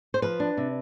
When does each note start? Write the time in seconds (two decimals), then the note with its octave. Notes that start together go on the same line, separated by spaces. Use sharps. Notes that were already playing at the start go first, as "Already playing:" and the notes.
0.14 C5
0.22 F3 B4
0.40 D4
0.57 C3